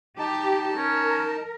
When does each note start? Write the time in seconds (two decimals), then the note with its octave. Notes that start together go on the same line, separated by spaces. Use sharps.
0.19 D#4 G4 A5
0.77 C#4 A#4